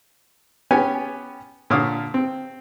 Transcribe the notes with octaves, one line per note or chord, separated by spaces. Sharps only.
B3 C#4 G4 G#5
A#2 D3 C#5 F5 D#6
C4